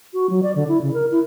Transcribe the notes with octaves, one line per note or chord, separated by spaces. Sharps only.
F#4
F#3
D5
D3
E4
C#3
A#4
E4